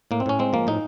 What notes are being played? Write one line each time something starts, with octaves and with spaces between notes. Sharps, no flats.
A2 A#3
C4
A2 C#4
G#3 C4
F3 A#3
A2 D#4